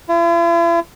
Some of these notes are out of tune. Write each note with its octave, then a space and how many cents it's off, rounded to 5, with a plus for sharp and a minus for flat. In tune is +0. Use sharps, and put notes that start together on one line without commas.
E4 +45